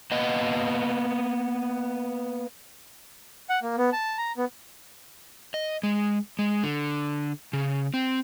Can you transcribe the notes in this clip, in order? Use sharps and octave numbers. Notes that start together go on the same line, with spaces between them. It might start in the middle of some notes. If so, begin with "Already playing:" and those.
A#3 B3 D#5
F#5
A#3
B3
A5
A#5
B3
D#5
G#3
G#3
D3
C#3
C4